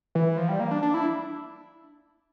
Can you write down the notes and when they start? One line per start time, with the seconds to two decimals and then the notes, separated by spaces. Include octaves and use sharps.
0.15 E3
0.37 F3
0.49 G3
0.60 A#3
0.71 D4
0.83 D4
0.94 E4